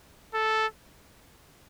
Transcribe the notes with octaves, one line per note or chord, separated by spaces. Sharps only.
A4